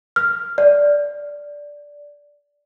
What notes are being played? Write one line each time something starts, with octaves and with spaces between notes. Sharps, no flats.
F6
D5